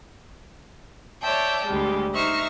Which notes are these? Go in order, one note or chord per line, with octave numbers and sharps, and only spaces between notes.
C#5 D5 E5 G5 A5
D2 G3 G#3
D#4 C5 E5 C#6 F6 A#6